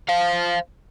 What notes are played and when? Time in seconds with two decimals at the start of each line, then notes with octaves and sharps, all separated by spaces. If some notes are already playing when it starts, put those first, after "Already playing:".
0.09 C5 F5